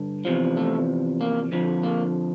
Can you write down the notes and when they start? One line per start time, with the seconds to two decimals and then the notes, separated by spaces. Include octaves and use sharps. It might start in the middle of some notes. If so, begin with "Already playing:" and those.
Already playing: G2 D3
0.25 E2 C3 F3
0.57 A3
1.21 A#3
1.52 F2 D3 F3
1.83 A#3